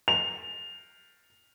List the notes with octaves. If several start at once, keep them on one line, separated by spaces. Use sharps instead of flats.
F7